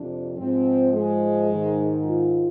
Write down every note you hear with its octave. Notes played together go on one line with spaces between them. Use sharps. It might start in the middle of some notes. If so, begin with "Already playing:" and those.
Already playing: F2 C3 F3 D4
G#2 F3 C4
G#3
G#2 D#3
F4